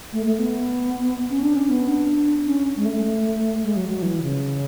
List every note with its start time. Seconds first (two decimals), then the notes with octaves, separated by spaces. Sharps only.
0.13 A3
0.26 A3
0.38 B3
1.30 C#4
1.42 D4
1.55 C#4
1.69 B3
1.89 D4
2.46 C#4
2.77 G#3
2.85 A3
3.63 G#3
3.76 F#3
3.89 F#3
4.02 E3
4.22 C#3